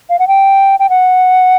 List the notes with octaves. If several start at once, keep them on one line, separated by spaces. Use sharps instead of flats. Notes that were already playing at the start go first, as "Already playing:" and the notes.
F5
F#5
G5
G5
F#5